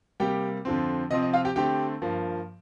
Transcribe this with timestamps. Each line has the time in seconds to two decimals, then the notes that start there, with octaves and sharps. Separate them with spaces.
0.20 C3 G3 A#3 G4 G5
0.65 F2 D3 F3 C4
1.11 C3 F3 C4 D#5
1.22 D#5
1.33 F4 F5
1.45 G4 G5
1.56 D3 A3 C4 G4 G5
2.02 G2 F3 A#3